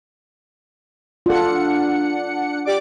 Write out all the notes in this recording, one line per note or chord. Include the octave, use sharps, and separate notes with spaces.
D4 F4 A4 F#5 C#7
G4 D5 D6